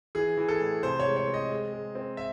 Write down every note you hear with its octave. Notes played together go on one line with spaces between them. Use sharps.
E3 G#4
E3
A4
A2
C3 C5
C#5
G#3
C#5
C4
D#5
G#3
G#3
C4
E5